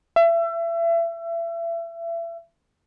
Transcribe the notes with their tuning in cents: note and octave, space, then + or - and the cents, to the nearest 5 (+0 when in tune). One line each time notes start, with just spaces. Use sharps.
E5 +30